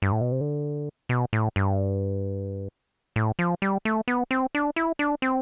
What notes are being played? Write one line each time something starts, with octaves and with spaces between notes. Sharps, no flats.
G2
A2
B2
C3
D3
B2
A2
G2
A2
F3
G3
A3
B3
C4
D4
E4
D4
C4